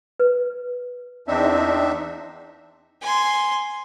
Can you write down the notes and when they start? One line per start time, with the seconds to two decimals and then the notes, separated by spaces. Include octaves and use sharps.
0.20 B4
1.28 E2 C4 D4 D#4 E5
3.01 G#5 C6